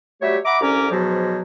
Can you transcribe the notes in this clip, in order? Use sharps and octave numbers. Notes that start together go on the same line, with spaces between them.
F#3 G3 A3 G4 C#5 E5
E5 F#5 A#5 B5 D6
C2 D3 C#4 A#5 D6
G#2 B2 F3 F#3